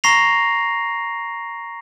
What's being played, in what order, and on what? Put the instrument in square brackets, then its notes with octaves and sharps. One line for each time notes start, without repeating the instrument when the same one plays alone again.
[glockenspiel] A#5 C#6 A#6 C7 F7